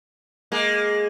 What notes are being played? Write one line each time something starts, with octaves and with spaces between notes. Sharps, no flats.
G#3 A#3